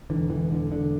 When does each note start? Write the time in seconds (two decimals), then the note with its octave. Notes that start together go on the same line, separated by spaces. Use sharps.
0.10 E1 D2 D3 E3
0.30 E3
0.51 D3
0.72 D3